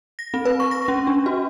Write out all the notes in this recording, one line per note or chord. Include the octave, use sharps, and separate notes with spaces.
A#6
C4
B4
C#6
A#6
C#4
D4
F#4